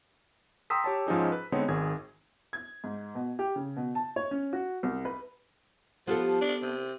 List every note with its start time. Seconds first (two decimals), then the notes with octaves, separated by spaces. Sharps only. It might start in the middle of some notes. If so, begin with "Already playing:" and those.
0.70 G5 A#5 C6 D#6 E6 B6
0.84 G4 C#5 A5
1.07 G#2 F3 C#4 D#4 G#4
1.32 B4
1.52 D3 G#3 B3 C4 D#4 C#5
1.68 G#1 D#3 G#4 G#6
2.53 G#6
2.84 G#2
3.15 B2
3.39 G4
3.56 C#3
3.76 B2
3.95 A5
4.16 C#5
4.31 C#4
4.53 F#4
4.83 C2
5.05 B4
6.07 F3 B3 G4 A4
6.41 D4
6.62 C3